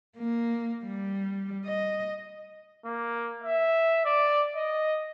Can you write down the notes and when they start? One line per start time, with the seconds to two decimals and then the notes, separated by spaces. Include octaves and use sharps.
0.17 A#3
0.84 G3
1.65 D#5
2.85 A#3
3.44 E5
4.05 D5
4.55 D#5